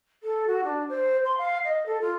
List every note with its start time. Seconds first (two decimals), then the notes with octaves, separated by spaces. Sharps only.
0.23 A4
0.47 F#4
0.64 D4
0.89 C5
1.24 C6
1.37 F5
1.64 D#5
1.86 A4
2.01 F4